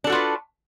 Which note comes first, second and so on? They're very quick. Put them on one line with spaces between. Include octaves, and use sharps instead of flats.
D4 A4 F#4 F4 B4